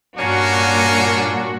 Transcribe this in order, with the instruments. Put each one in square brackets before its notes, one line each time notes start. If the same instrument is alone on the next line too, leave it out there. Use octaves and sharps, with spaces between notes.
[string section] G2 A#2 F#4 [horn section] A#3 C#4 D4